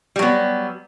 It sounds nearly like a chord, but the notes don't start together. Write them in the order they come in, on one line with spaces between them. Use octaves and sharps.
G3 F#3 B3